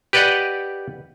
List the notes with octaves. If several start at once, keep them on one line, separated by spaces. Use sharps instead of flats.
G4 B4 D5 D#5 F#5